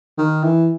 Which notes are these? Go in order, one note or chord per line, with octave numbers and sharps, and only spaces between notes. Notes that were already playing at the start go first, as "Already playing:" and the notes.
D#3
E3